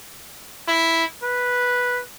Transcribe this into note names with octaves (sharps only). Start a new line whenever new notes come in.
E4
B4